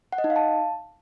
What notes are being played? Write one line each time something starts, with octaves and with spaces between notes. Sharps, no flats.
F#5
D#5
D#4
F5
A5